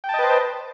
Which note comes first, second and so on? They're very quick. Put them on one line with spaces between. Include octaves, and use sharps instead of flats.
G5 A5 D#5 B4 C5